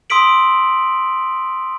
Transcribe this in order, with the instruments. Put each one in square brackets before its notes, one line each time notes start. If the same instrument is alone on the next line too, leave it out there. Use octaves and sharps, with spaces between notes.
[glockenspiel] C6 D#6 E6 B6 D7 F#7